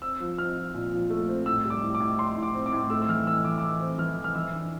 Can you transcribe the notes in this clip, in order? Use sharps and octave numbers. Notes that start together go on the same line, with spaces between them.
C4 E6
F3
C4 F6
F3
A#2
F3
A3
C4
A2 E6
G3
D6
A2
D6
A2
A2 C6
A2
D6
C4
D6
A2
A3 E6
E6
E3 F6
E3 E6
E3 D6
D6
E3 E6
C4
E3 F6
E3
F6
E3 E6
D4